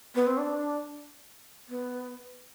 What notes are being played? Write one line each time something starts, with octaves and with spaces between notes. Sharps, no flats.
B3
C4
D4
B3